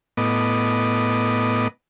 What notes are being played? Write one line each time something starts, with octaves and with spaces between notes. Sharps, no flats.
A2 B3 D#5 D6